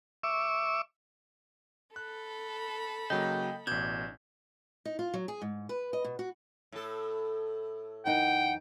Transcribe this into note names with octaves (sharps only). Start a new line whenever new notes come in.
E5 C#6 D6 E6
A4 B5 F#6
C#3 F#3 A#3 D#5 G5
A1 B2 D4 G6 G#6
D#4
F4
F#3
G#4
G#2
B4
D#5
B2
F#4
A2 A4
F#2 E3 D#4 F#5 G5